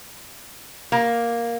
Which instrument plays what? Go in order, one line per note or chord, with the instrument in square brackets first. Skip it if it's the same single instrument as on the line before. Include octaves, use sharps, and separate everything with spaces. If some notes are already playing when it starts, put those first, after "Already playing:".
[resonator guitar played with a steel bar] A#3